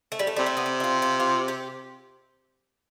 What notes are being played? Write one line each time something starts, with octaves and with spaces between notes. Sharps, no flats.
A3
G3
A3
C3 G3
A3
B3
C4
E4
F4
F4
F4
G4